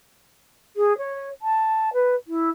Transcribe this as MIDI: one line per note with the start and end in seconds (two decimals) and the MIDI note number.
0.76 0.96 68
0.97 1.29 73
1.41 1.89 81
1.93 2.15 71
2.27 2.49 64